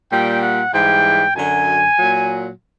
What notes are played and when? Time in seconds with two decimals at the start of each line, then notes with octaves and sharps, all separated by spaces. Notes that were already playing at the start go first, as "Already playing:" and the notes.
0.11 A#2 G3 G5
0.42 F#5
0.73 G#2 E3 G3 G5
1.35 F#2 D3 F#3 G#5
1.98 A#2 F#3